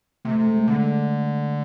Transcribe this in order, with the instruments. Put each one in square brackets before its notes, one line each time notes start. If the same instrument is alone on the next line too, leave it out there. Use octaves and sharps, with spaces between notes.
[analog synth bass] C3 [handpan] A3
[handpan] A3
G#3
A3
[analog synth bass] D3 [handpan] G#3